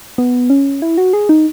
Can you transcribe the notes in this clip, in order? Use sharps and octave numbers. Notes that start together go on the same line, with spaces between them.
B3
C#4
E4
F#4
G#4
D#4